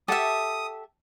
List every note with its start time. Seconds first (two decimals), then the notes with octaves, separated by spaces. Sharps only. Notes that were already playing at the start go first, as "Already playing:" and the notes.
0.08 G4 A4 E5 F#5 A5 D#6